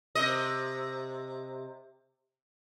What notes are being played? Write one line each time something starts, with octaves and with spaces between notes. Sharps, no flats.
C3 D#5